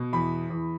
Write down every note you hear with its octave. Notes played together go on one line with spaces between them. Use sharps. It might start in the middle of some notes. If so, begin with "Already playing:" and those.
Already playing: B2
E2 B5
E2